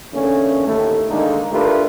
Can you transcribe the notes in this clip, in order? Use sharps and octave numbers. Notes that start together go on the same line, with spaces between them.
E2 D3 A3 A#3 C#4
D#2 A2 A3
D3 D#3 G#3 A#3 D#4
A3 D4 F4 G4 A#4 B4